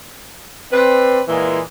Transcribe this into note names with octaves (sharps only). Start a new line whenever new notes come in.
C4 B4 D5
A#2 E3 G#3